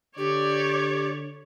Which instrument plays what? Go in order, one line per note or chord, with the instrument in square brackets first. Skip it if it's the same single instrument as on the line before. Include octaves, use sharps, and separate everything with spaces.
[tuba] D3 [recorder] G4 [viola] C#5 [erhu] D5